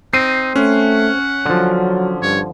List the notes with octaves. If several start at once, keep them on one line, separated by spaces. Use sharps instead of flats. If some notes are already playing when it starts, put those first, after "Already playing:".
C4 D#4 C7 D#7
A3 C#4 F#5
D3 F3 F#3
G2 C#5